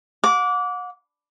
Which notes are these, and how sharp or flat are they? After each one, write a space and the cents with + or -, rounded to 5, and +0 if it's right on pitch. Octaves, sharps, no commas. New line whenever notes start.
F#5 -35 D6 -20